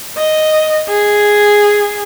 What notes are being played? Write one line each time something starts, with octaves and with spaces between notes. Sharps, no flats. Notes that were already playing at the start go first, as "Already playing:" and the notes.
D#5
G#4